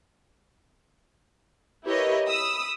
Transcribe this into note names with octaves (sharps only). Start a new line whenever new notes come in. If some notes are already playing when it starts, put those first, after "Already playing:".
E4 G4 A#4 B4 C#5 D#5
B5 D#6 E6